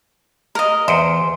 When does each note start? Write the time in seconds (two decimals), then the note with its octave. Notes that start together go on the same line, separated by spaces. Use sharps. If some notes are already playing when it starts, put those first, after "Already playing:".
0.55 A#4 D#5
0.88 E2 C5